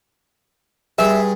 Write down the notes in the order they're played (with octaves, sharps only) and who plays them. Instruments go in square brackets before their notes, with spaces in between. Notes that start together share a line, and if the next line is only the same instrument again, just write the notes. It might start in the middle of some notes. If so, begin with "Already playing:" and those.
[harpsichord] G2 G#4 [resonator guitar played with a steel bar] E5